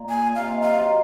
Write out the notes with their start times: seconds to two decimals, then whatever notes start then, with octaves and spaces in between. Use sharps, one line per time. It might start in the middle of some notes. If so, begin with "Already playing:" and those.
Already playing: A#2
0.09 G#5
0.29 A#2
0.35 C3 F5
0.49 D#3
0.62 F3 F5
0.76 D#3 F#3